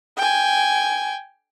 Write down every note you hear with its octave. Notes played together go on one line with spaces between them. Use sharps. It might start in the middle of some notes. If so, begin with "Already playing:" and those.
G5 G#5